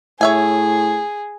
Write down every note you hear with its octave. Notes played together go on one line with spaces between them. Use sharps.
A2 G#4 C#5 E5 G#5